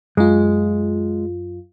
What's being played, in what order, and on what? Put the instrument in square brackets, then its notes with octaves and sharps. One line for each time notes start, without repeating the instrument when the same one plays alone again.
[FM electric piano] F#2 F4 [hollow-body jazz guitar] G#3